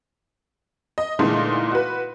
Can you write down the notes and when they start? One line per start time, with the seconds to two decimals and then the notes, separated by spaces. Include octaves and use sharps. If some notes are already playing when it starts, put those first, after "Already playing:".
0.98 D#5
1.19 A#2 D3 E3 G#3 A3 D#4
1.72 F#4 B4